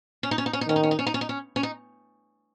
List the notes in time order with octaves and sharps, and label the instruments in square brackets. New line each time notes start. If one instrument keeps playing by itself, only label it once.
[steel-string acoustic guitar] C#4
D#4
C#4
D#4
C#4
D#4
[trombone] D#3 [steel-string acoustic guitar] C#4
[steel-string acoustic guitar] D#4
C#4
D#4
C#4
D#4
C#4
D#4
C#4
C#4
D#4